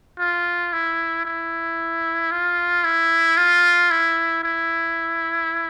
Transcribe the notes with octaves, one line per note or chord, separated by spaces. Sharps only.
F4
E4
E4
F4
E4
F4
E4
E4